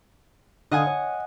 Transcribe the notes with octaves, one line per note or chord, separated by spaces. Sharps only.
D3 D#5 F5 F#5 G#5 D#6
C#5